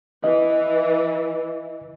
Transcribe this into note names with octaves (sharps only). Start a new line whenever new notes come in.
E3 D#5